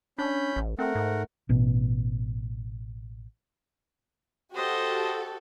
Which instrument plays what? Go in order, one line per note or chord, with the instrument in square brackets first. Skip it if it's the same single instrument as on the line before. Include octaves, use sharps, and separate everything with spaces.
[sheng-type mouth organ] C#4 B5 G6 [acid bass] D4
[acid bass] A1
[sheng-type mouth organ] A3 A#4 F#5 [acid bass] C4
[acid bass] G#2
[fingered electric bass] A1 B2
[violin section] F#4 G4 A4 [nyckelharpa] C5 D#5